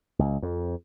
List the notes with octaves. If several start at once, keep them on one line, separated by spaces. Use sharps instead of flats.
C#2
F2